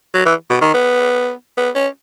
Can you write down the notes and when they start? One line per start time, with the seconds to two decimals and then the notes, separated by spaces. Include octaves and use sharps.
0.14 F#3
0.26 E3
0.50 B2
0.62 D#3
0.74 B3
1.57 B3
1.75 C#4